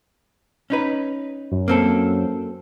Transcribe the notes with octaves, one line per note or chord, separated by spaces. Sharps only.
C#4 D#4 B4
F#2
A#3 C4 A4